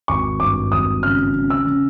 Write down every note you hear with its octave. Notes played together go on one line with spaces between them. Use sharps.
G#1 C#6
G2 D6
G#1 D#6
C#3 F6
C#3
E6
C#3